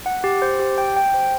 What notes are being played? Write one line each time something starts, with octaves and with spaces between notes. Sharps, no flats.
F#5
G4
C5
G4
G5
G5
C5